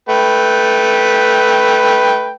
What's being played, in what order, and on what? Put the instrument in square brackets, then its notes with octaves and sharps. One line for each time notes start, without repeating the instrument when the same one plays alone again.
[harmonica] A3 B4 G5